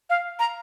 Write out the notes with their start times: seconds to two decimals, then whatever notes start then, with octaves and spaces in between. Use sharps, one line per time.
0.10 F5
0.39 A#5